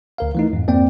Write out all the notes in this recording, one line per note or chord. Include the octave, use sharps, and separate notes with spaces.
D2 A#4 F5
E3 A3 D#4
F2 G#2
F2 A#3 C4 D5 G5